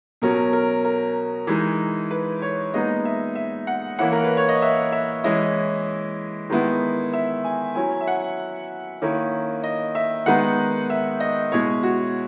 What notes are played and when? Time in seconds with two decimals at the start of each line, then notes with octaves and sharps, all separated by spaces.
0.22 B2 F#3 C#4 A#4
0.53 A#4
0.85 A#4
1.47 E3 G#3 D#4
2.11 B4
2.42 C#5
2.74 A#2 G#3 B3 D#4 D#5
3.05 E5
3.35 E5
3.67 F#5
3.99 E3 A#3 C#4 E4 F#5
4.12 A#4
4.24 B4
4.37 C#5
4.49 D#5
4.62 E5
4.92 E5
5.24 E3 G#3 C#4 E4 D#5
6.50 D#3 G#3 B3 E4
7.13 E5
7.44 G#5
7.75 F#3 C#4 E4 G#5
8.01 E5
8.07 F#5
9.02 D#3 A#3 C#4 E4
9.63 D#5
9.95 E5
10.26 D#3 G#3 B3 D#4 F#5
10.90 E5
11.20 D#5
11.52 B2 G#3 C#4 E4 C#5
11.83 F#4